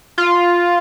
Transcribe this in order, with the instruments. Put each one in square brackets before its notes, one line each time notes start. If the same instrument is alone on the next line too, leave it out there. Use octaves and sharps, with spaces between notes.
[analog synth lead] F4